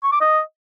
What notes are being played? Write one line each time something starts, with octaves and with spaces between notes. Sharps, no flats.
C#6
D6
D#5